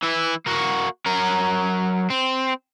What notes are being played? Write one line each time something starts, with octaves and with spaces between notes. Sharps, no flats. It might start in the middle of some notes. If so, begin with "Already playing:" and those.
E3 E4
A#3 F#4
F#3 A#4
C4